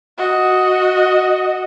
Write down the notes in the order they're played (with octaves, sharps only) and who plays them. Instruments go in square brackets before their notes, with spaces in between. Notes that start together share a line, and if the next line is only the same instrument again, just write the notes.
[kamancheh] F#4 D#5